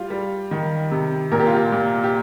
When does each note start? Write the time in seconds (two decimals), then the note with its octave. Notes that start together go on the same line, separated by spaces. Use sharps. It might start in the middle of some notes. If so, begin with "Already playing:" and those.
Already playing: G3 F4
0.10 G3
0.51 D#3
0.91 C3
1.32 A#2 A#4
1.39 G4
1.47 F4
1.54 G4
1.72 A#2
2.04 G4